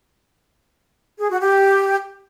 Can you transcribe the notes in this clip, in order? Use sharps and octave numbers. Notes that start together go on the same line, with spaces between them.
G#4
F#4
G4